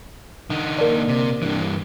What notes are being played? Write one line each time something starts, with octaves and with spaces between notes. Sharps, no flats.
D3 D#4
A#3 D4
C3
G2 E3